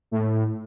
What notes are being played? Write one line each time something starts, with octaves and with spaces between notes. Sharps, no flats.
A2